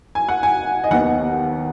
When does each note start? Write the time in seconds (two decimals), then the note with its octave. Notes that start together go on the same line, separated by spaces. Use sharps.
0.15 G#5
0.29 F#5
0.43 G#5
0.84 D#5
0.91 D#2 D#3 B3 F#5